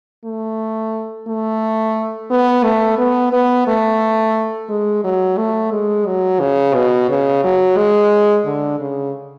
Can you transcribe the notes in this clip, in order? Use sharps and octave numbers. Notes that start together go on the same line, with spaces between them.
A3
A3
B3
A3
B3
B3
A3
G#3
F#3
A3
G#3
F#3
C#3
B2
C#3
F#3
G#3
D3
C#3